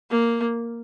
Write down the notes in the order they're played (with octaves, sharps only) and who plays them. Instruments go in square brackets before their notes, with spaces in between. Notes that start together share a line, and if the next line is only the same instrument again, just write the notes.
[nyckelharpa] A#3